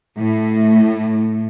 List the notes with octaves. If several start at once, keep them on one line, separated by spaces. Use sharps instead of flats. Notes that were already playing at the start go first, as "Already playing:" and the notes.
A2